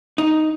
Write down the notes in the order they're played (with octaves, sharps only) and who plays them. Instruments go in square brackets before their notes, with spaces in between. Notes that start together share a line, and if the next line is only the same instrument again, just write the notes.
[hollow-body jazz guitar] D#4